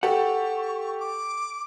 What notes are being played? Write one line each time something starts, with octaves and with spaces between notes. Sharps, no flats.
G4 A4 F#5 C#6
D6